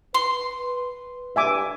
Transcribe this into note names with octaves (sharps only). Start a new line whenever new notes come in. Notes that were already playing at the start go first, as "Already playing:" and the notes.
B4 C6
G2 E5 G#5 D6